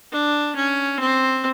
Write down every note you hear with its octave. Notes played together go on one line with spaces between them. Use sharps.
D4
C#4
C4